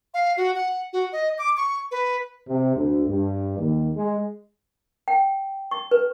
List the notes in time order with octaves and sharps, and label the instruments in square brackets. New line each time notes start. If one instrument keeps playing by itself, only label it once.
[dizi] F5
F#4
F#5
F#4
D#5
D6
C#6
B4
[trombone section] C3
D2
G2
D#2
G#3
[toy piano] G5
C#6
B4